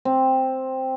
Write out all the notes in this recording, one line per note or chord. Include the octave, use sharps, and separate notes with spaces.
C4